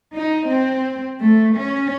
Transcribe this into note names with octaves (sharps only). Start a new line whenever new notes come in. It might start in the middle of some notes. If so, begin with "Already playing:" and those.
D#4
C4
A3
C#4